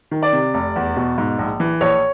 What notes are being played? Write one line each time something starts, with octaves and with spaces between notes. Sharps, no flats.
D#3
D5
C3
F1
E2
B2
G#2
A#1
E3
A#1 C#5